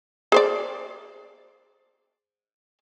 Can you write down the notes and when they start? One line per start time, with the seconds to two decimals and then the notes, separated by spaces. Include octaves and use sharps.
0.32 G#4 C5 D5